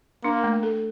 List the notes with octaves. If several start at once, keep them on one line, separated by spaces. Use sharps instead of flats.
A#3 D4
A3
A4